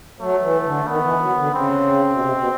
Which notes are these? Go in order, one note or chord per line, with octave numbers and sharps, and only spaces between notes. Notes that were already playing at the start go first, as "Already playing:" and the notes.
F#3 A3
E3
D3
D#3 B3
E3
F#3
D3
C#3 C4
B2
C3
B2